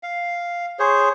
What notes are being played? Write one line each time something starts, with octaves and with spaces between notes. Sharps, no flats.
F5
G#4 C5 C#5